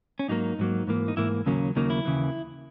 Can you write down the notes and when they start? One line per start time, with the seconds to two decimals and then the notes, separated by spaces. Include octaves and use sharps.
0.19 C#4
0.29 G#2 F#3 A#3 D#4
0.59 G#2 F#3 A#3
0.87 G#2 E3 A#3
1.08 D#4
1.17 G#2 E3 A#3 E4
1.46 D#2 C#3 F#3 A#3 C#4
1.76 D#2 C#3 F#3 A#3 D#4
1.90 E4
2.05 D#2 C#3 E3